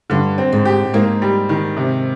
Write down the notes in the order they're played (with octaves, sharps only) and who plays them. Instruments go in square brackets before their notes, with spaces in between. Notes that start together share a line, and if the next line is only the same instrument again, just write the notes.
[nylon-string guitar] G2 [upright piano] D3
[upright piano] C4
[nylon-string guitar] G#2
[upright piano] G4
[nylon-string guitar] G#2 [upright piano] A#3
[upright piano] G3
D#3
C3